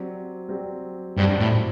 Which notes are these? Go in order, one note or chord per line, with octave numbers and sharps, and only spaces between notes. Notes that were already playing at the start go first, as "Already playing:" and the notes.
Already playing: F#3 C4 G4 D5
F#3 C4 G4 D5
G2 F#3 C4 G4 D5
A2